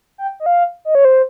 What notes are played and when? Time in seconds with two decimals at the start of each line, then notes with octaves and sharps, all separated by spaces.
0.18 G5
0.40 D#5
0.46 F5
0.85 D#5
0.95 C#5
1.05 C5